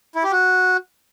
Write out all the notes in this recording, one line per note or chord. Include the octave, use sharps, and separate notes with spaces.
E4
G4
F#4